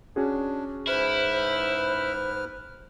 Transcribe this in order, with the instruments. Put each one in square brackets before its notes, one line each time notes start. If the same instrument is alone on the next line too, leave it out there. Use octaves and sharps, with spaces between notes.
[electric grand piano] C#4 F#4 G#4 [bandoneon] D4
[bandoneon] G#2 B4 F6 [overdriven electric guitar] E4 [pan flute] C5